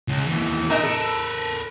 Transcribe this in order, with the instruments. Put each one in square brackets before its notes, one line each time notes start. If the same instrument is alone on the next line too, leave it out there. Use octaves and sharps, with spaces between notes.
[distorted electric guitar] C#2
D#2 E3
[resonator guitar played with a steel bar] A#2 D#4 E5 [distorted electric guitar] A#4 B4
[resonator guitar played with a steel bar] A4